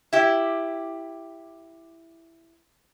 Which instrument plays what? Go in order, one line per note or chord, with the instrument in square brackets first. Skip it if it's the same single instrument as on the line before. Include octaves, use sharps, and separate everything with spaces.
[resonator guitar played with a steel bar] E4 G4